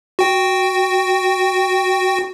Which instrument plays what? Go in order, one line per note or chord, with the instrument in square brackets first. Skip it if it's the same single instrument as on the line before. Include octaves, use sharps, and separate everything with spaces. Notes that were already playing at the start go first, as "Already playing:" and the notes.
[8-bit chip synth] F#4 G5